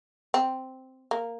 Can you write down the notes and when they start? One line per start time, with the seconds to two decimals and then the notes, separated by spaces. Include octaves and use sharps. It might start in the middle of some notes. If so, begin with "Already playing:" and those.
0.34 C4
1.11 A#3